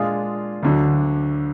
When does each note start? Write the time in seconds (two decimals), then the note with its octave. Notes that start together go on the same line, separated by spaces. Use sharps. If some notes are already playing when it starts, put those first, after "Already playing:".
Already playing: A#2 G#3 D4 F4 G#4
0.63 D2 D3 F#3